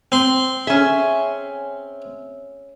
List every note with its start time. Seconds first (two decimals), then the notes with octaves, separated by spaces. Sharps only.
0.12 C4 C6
0.67 C#4 G#4 E5